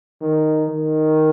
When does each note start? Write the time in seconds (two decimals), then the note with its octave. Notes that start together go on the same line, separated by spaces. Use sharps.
0.21 D#3
0.68 D#3